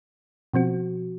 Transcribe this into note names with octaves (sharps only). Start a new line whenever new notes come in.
B2 F3 C4 F#4